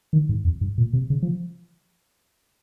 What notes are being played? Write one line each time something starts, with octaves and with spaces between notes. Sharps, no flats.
D#3
G#2
F2
G2
A#2
C3
C#3
F3